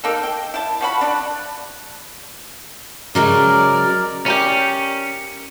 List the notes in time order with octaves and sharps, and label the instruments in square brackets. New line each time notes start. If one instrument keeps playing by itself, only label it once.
[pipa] A#3 D#4 A4
G5
E4 A5
F3 F#4 B5
D3 D4
[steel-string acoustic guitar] C#3 F#3 G#3 [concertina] A#4 D5
[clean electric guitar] C#4 [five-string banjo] G4 A#4 D5